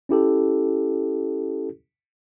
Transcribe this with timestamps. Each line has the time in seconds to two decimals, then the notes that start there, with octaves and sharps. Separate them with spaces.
0.09 C#4 E4 G4 A4